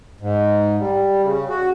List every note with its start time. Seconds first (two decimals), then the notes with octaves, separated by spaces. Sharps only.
0.20 G#2
0.79 G3
1.23 C#3
1.49 F#4